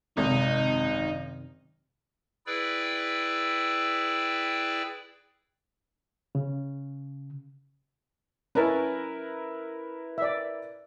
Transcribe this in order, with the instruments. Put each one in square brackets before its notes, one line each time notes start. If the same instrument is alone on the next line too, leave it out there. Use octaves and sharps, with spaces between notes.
[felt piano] G#1 [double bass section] F#2 C3 D#3 [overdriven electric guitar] D#4
[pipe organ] E4 G#4 B4 D5 G5 E6
[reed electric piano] C#3
[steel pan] C#4 A5 [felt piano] E4 A#4 B4
[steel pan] D5 E5